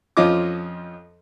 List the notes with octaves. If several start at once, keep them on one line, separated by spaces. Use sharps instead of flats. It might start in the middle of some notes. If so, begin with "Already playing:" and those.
F2 F3 C#4 F4 D#5 D6